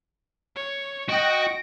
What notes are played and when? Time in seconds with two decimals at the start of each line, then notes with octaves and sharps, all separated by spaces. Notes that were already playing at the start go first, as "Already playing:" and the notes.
0.56 C#5
1.09 F#4 D#5 G5 A#6 D7